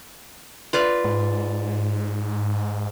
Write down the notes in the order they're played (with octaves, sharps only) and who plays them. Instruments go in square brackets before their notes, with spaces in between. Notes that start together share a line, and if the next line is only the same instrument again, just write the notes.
[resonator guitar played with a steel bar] F4 B4 D5
[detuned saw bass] G#2